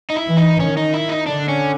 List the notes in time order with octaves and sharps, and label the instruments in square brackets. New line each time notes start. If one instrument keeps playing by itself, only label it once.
[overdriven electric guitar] D#4
E4
[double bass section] E3
[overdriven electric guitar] D#4
[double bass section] D#3 [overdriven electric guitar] C#4
[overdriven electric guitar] D#4
E4
D#4
[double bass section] D3 [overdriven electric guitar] D4
[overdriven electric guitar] C#4